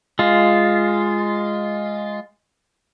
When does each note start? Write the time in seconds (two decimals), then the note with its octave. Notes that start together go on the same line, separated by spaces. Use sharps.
0.19 G#3 F4